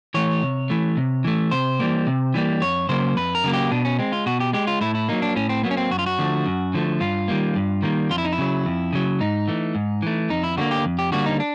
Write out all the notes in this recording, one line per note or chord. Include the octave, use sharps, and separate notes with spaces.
E3 A3 C#5
C3
E3 A3
C3
E3 A3
C3 C5
E3 G3 A#3
C3
E3 G3 A#3
F2 C#5
C#3 F#3 A#3 C5
F2 B4
A#4
C#3 F#3 A#3
G4
B2 D4
C#4
G#3 C4
F4
B2 F#4
G4
G#3 G4
F4
A2 E4
E4
F#3 A#3 D#4
D4
A2 C#4
C4
F#3 A#3 B3
C#4
C4
F#2 F#4
F4
F#4
D3 F3 A3
F#2
D3 F3 A3
G2 F4
D#3 G3 A#3
G2
D#3 G3 A#3
F2 F4
E4
D#4
E4
C#3 F#3
F2
C#3 F#3
G#2 D#4
E3 A3
G#2
E3 A3
F2 D#4
E4
D3 G3 A#3 F#4
G4
F2
G4
D3 G3 A#3 F#4
D#4
D4